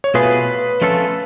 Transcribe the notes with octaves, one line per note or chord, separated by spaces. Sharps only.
C#5
B2 A3 F4 G#4 B4
F3 A3 C#4 F4 A4